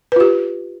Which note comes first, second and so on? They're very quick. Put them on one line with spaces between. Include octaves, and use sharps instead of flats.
B4 F4 G4